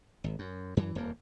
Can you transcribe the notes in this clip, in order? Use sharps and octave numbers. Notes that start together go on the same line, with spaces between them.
G#1
F#2
F#2 E3
D#1 F2 A#3